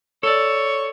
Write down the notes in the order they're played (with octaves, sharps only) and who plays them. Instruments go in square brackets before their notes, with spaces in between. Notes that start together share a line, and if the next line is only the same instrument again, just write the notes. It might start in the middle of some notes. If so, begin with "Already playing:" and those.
[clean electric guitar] A4 D5 [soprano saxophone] C#5